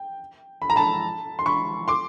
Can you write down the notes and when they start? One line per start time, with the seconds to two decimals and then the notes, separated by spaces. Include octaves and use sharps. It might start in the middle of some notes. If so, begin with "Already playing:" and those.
Already playing: G5
0.62 B5
0.70 A#5
0.76 A5 B5
1.39 C6
1.46 B5 C#6
1.88 C6 D6